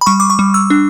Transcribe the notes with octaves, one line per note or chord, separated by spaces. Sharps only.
B5
G3 C#6
D6
C#6
G3
E6
D4